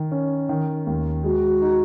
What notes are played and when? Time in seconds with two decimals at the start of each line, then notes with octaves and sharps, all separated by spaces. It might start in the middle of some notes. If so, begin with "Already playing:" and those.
Already playing: D#3
0.11 C#4
0.49 D#3
0.87 D#2
1.24 G#3 F#4
1.62 D#4